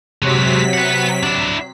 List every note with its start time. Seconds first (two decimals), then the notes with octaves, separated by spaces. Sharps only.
0.22 C3 F#3 G#3 F#4 B6
0.74 B4 F#5
1.23 D4 E4